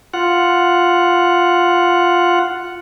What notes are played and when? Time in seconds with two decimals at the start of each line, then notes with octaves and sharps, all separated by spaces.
0.14 F4 F#5